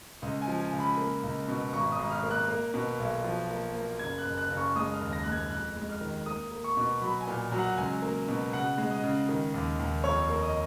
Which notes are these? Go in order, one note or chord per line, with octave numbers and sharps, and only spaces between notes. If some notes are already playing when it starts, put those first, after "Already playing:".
C#2 D#5
G#5
F3
G#5
C#2
B5
A#3
C#2
B2
G#1 C#6
D#6
G#1
F6
A#3
F#6
A#3
B2
B1
F3
A#3
A#3
F#1 G#6
F#6
F#1
F#6
F#1
C#6
G#3 D#6
F6
D#2
A#6
G#3 F#6
G#6
F2 F#6
G#3
F6
D#3
A#3 D#6
A#3
C#6
B2
F#3 B5
G#5
A#2
F#3
F#5
C#2 G#5
A#3
B2
C#3 F#5
G#3
D#5
C#3
D#3
D#2
D#2
F2 C#5
A#3
D#5